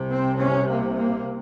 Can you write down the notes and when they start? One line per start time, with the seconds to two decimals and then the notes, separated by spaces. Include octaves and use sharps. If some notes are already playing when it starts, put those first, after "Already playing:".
Already playing: C2 C3
0.11 C4
0.40 C#4
0.69 A#3
0.96 A#3